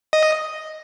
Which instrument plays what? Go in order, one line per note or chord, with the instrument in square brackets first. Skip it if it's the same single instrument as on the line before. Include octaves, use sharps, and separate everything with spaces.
[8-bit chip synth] D#5